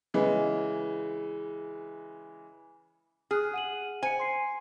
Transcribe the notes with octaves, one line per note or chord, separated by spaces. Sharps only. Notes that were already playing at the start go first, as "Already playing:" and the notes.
C#3 E3 G#3
G#4 F6 F#6
F#5 D#7 F#7
C5 G#5 C#7
C6 C7